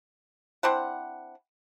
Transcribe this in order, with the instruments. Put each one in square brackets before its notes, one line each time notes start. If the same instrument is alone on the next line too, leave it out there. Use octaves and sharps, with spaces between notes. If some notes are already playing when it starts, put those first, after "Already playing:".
[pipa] C4 D4 E4 F#5